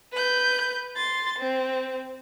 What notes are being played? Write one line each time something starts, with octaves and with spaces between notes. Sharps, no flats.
B4 G6
C6 A6
C4